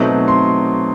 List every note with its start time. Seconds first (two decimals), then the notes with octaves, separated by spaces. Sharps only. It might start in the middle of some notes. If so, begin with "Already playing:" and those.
Already playing: B2 F#3 A3 C4 D#4
0.28 C6